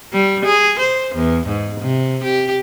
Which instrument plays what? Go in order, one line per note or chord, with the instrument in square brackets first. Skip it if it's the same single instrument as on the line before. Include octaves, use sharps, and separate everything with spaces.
[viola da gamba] G3
G#4
C5
E2
G#2
C3
G4